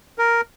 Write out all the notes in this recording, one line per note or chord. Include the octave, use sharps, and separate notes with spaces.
A#4